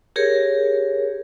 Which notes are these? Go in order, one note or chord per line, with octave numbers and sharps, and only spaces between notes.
G4 G#4 A#4 C#5